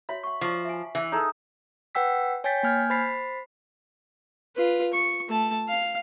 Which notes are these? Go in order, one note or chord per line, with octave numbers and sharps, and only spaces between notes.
F#4 C#5 E5 B5
F#5 C#6
F3 A5 C#6 D6
E5 G#5
E3 E5
D#4 G#4 A4
B4 F#5 G5 E6 B6
C#5 G5 G#5 G6 A6 B6
A#3 G#5 F6 G6 G#6
C5 B5 A6 B6 C7
F4 B4
C#6
A3 A5
F5